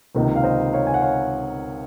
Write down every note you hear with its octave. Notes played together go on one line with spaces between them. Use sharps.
C#2 C3 D#3 A#3 D#4
F5
C5 D#5
C#5 F5
G#5
F#5
C#5 F5